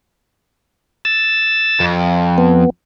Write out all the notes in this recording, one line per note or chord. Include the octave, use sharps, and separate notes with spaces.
E6 A6
F2
B3